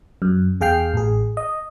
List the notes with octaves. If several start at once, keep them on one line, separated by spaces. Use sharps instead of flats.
F#2
E2 G#4 F5 G5 F6 C7
A1 G#4
D#5